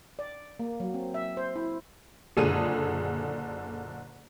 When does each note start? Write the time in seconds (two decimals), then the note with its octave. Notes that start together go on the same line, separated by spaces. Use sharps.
0.19 D5
0.60 A#3
0.80 F#3
0.94 C4
1.14 E5
1.37 C5
1.56 E4
2.37 F#1 A#2 D3 G#4 A4 D#7